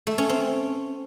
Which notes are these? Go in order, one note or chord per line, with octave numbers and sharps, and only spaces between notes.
A3
C#4
C4